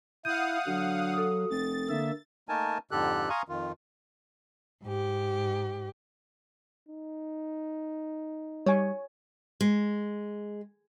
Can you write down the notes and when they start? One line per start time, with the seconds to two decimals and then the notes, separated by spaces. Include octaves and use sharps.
0.25 E4 F5 F#5 D#6 G6 D#7
0.67 D3 F#3
1.13 A4 D#6
1.50 F1 A6
1.89 D3 A#3 E5
2.49 A3 A#3 D#4 A#4 G#5 A5
2.91 F2 G#2 D3 G4 A4 F#6
3.30 F5 G#5 A#5 C6 C#6 D#6
3.49 F2 D#3 F4
4.84 G#2 G4
6.89 D#4
8.66 G3 C#5 G#5
9.61 G#3